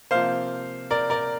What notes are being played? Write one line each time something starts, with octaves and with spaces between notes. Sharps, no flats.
C3 F3 A#3 C5 F5
A#4 D5
A#4 D5